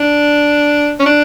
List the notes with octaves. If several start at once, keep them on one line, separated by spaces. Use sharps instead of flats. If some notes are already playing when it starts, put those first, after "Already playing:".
Already playing: D4
C#4
D4